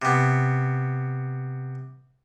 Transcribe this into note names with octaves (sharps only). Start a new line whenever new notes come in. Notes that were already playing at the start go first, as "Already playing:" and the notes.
C3 B3